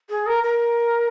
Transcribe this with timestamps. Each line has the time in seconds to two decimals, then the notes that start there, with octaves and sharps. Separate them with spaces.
0.10 G#4
0.27 A#4
0.43 A#4